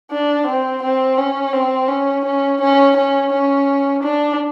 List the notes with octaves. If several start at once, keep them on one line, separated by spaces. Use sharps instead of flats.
D4
C4
C4
C#4
C4
C#4
C#4
C#4
C#4
C#4
D4